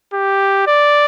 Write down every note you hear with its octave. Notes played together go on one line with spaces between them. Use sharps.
G4
D5